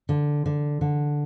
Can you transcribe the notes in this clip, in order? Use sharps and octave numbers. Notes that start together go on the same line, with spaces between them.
D3
D3
D3